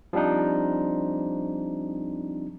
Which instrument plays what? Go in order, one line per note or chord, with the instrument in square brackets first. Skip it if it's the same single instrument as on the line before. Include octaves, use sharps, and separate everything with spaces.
[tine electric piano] F3 G3 C4 D4 D#4